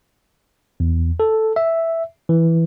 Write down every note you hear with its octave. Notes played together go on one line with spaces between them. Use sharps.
E2
A4
E5
E3